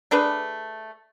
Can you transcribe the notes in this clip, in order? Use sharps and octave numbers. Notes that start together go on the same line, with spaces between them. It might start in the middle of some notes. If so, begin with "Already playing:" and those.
A3 D4 G#4 B4